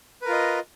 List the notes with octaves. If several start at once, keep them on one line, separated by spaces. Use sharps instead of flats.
F4 A#4 B4 D#5